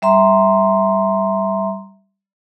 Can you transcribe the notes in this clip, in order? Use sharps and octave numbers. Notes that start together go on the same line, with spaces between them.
G3 E5 A#5 C6